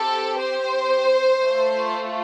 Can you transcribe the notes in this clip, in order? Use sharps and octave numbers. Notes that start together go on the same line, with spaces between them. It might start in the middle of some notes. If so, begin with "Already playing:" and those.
Already playing: C4 G4 A4
C5
A3 F4 A4